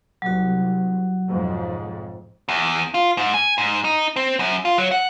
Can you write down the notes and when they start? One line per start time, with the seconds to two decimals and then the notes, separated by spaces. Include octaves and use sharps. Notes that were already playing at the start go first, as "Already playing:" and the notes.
0.22 C2 F#3 F#4
1.30 B1 F2 G#2
2.49 E2
2.94 F4
3.17 G#2
3.34 G#5
3.58 G#2
3.84 D#4
4.16 C4
4.39 F#2
4.65 F4
4.78 F#3
4.92 F#5